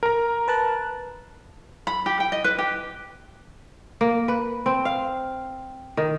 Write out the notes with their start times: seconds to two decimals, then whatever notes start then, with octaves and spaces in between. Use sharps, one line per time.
0.03 A#4 A#5
0.48 B4 A5 F#6
1.87 B5
2.06 G4
2.20 G5
2.32 D#5
2.44 B4
2.59 G4
4.01 A#3
4.28 B4
4.66 C4
4.85 F5
5.97 D#3